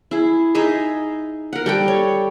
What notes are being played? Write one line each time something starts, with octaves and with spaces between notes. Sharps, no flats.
E4 G#4
D#4 G#4 D#5 E5
A#4 F#5
G3 A4 G5
C#5